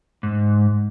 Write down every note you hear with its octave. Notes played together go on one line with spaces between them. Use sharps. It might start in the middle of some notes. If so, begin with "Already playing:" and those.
G#2